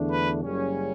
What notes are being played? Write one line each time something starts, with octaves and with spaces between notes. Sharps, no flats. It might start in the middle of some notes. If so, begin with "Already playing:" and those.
Already playing: E2 D3 A3 D4
B4
F#1 F#2 C#3 G3 C#4